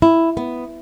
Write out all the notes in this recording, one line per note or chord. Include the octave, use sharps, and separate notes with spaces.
E4
B3